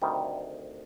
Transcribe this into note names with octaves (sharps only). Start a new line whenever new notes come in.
D2 C3 D#3 G3